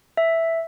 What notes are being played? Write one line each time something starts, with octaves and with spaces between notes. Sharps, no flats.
E5